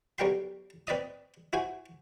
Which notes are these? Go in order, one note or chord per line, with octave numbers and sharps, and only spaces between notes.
B1 G3 A#4 G5 C6
C4 B4 D5 D#5 D#6
E4 F#4 C5 G#5